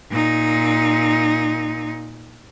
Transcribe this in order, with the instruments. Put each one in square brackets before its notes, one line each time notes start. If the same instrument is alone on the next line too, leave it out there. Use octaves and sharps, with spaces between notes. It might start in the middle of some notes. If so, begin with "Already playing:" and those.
[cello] A#2 D#4